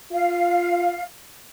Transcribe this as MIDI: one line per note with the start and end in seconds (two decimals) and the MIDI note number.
0.12 0.95 65
0.12 1.03 77